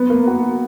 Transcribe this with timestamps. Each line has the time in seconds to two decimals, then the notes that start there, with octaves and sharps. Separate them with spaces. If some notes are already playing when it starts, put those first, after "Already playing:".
Already playing: B3 B4
0.10 A#3 A#4
0.28 F#4